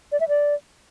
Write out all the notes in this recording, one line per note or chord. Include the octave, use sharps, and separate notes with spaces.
D5
E5
D5